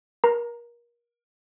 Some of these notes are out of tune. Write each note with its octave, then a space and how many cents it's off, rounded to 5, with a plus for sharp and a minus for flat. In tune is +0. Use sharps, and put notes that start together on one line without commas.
A#4 +30 A#5 +0